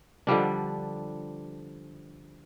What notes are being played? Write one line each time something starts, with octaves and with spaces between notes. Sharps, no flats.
D3 F3 G3 D4